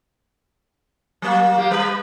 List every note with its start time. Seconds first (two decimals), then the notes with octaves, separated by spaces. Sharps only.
1.22 F#3 A#3
1.58 A#3 G4
1.71 G3 B4